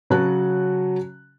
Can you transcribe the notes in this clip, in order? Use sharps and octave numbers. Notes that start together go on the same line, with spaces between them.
C#3 F#3 F#4 A5 F#6